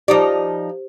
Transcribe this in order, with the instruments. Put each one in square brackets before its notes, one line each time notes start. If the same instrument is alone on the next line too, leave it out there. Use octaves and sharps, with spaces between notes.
[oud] F3 D#4 D5 [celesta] G4 C5